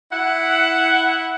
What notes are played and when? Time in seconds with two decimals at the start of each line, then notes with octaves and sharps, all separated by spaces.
0.12 E4 F#5